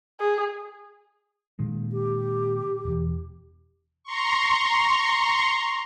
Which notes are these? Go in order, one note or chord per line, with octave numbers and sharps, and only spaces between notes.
G#4
A#2 D#3 G#3
G4
E1 E2
A#5 C6 C#6